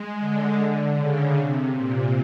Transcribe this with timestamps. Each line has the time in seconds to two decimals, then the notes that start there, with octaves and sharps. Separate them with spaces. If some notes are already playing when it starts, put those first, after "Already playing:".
Already playing: G#3
0.20 D3
0.97 C#3
1.36 C3
1.75 A#2